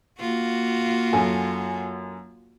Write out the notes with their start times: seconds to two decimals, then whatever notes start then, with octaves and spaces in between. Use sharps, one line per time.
0.19 A#3 F4 F#4
1.13 F#2 A4 G#5